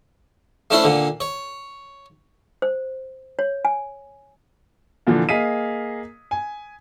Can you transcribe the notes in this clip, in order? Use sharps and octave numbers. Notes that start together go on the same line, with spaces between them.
A3 C#4 D4 E4 C5
A#2 D3
C#5
C5
C#5
G#5
A#2 D3 E3 F3
A#3 G#4 D#5 F5 B6 D#7
G#5